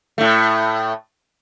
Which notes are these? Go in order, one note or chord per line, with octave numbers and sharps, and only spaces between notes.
A2 A3